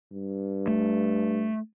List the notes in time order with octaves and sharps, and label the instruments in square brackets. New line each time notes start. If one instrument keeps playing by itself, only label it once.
[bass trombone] G2
[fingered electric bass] A3